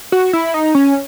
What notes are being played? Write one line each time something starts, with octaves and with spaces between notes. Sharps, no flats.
F#4
E4
D#4
C#4